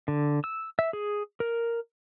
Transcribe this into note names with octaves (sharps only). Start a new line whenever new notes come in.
D3
E6
E5
G#4
A#4